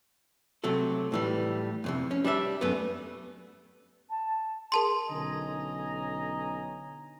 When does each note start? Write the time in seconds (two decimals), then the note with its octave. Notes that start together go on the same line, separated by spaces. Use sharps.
0.64 C3 F#3 A3 A4
1.12 A2 E3 G3
1.84 F2 A2 C3
2.11 C#4
2.25 G3 D4 G#4 E5
2.61 F#2 A3 B3
4.09 A5
4.72 G#4 A#4 A5 C6
5.09 B1 D3 C#4 D#5 G#5 A#5